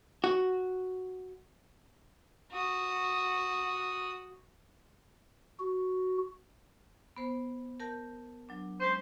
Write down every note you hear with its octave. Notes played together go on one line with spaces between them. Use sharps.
F#4
F#4 D#6
F#4
B3 C5
A#4 A5 G6
F#3 D4
G#3 C#4 C5